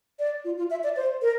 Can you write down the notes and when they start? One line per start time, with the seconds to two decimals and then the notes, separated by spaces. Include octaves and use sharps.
0.19 D5
0.45 F4
0.58 F4
0.70 E5
0.84 D5
0.96 C5
1.22 A#4